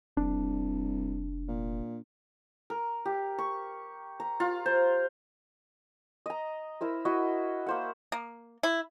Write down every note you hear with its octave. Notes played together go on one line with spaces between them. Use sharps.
F1 C2 D4
A#2
A#4
G4
C#6
A#5
F4
C5
D#5 A#5
E4 A#4 C5
E4 F#4 D#5
A#3 C5 F#5
A#3
E4